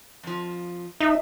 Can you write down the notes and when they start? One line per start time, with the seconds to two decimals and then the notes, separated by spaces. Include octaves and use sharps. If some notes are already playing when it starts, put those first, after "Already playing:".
0.23 F2 F3
1.00 D#4 E5